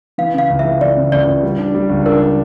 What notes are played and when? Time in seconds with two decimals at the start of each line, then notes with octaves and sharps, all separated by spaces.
0.18 E3 F5
0.34 C#3 F5
0.50 C#2
0.59 E5
0.65 E3
0.81 E3 D5
0.97 C#3
1.12 C#2 D5
1.27 C#2
1.43 G3
1.59 D4
1.74 G3
1.90 C#2
2.06 D4 A#4
2.21 D4